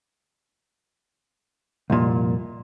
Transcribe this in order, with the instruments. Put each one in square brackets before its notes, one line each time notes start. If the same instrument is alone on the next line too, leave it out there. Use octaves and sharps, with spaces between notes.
[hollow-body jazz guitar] C2 F2 A#2